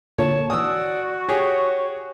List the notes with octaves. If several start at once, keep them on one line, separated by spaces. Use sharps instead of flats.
A#2 D3 A#3 C#5 A5
E3 F#4 D5 G#5 D#6 E6
G4 G#4 C#5